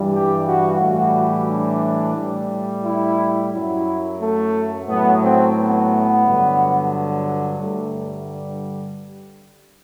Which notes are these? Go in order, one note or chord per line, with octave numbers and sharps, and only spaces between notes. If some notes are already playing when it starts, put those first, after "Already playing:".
Already playing: G2 E3 G3
G4
F#4
A2 E3 G3 F#4
D4
A2 G3
E4
F#2 F#3 E4
A3
A2 F#3 B3
C4
B3
G2 D3 F#3
G2 D3 G3 A3